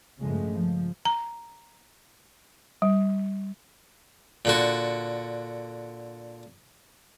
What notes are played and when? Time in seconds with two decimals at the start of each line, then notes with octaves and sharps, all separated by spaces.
0.19 G2 C#3 F3 G#3 A3
0.53 F3
1.05 A#5
2.82 G3
4.45 A#2 D3 F#4